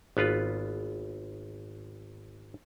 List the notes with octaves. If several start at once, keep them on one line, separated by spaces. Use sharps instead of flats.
G#1 B3 F4 B4